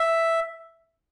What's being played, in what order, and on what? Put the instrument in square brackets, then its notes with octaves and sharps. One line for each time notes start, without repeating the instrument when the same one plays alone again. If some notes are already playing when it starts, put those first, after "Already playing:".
Already playing: [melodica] E5